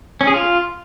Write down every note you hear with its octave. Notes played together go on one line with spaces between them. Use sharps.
C#4
G#4
F4